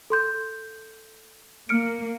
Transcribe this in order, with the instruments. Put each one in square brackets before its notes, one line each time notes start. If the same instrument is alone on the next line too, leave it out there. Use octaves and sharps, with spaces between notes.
[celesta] A4 C6 G6
[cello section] A#3 [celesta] F6 C#7 D7